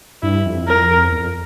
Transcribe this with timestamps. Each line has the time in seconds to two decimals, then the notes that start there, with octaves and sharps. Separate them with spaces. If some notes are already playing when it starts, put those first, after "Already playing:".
0.23 G2 E4
0.45 F2
0.68 F2 A#4
1.12 E2
1.20 F2